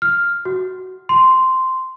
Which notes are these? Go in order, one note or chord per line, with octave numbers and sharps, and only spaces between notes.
F6
F#4
C6